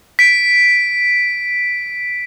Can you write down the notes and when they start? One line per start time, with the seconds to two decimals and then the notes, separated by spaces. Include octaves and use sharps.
0.19 B6 D7